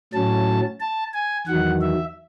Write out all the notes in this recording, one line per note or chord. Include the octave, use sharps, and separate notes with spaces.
A2 F#3 C#4 A5
A5
G#5
E2 D#3 F#3 F#5
E5